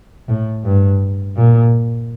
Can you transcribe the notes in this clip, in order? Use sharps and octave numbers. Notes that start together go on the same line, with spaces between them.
A2
G2
A#2